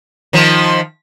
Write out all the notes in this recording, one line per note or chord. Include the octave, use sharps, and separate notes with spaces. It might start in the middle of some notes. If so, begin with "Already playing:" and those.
D#3 F3